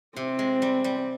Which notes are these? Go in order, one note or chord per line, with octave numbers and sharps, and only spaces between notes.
C3 C4
G#3
G3
G3